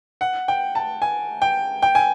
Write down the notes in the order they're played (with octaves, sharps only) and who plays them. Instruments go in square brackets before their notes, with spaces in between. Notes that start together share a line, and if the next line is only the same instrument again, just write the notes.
[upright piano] F#5
G5
A5
G#5
G5
G5
G#5